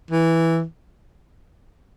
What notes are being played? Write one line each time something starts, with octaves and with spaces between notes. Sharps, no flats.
E3